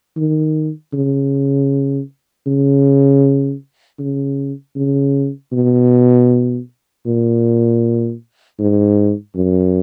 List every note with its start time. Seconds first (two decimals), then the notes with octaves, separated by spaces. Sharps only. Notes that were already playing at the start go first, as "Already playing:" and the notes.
0.17 D#3
0.93 C#3
2.47 C#3
3.99 C#3
4.76 C#3
5.52 B2
7.06 A#2
8.59 G#2
9.35 F#2